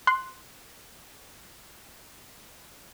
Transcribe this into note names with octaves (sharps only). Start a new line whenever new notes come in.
C6 F#6